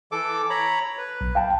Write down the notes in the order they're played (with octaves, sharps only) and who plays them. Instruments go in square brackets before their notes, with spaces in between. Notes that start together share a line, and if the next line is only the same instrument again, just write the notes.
[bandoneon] E3 A4 D6
C#5 A#5 B5
B4
[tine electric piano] B1
F5 G5 A5